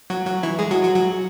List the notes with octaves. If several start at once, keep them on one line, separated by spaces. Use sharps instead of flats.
F#3 F#4
F#3 F#4
E3 E4
G#3 G#4
F#3 F#4
F#3 F#4
F#3 F#4